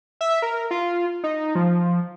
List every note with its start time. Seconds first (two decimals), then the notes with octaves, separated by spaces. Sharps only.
0.21 E5
0.42 A#4
0.71 F4
1.24 D#4
1.55 F3